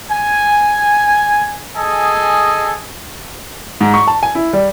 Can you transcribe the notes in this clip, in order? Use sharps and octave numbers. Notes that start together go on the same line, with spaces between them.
G#5
G#4 A4 D#5 G#5
G#2
C#6
A5
G#5
E4
G3